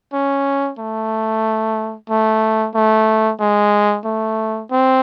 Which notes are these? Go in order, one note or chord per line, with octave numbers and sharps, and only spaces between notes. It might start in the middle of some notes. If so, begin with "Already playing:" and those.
C#4
A3
A3
A3
G#3
A3
C4